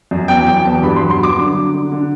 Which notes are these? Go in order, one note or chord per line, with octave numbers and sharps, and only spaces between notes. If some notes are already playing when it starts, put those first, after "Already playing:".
F#2
E2 G5
F#3 G5
E2 A5
G2 B5
C6
F#3
C6
F#3 D6
D3
D3
D3
D3